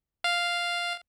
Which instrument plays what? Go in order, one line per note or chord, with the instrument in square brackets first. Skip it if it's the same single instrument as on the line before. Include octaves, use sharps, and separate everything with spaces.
[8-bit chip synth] F5